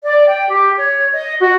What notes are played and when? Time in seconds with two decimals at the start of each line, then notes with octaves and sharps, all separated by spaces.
0.04 D5
0.27 G5
0.49 G4
0.78 C#5
1.13 D#5
1.40 F#4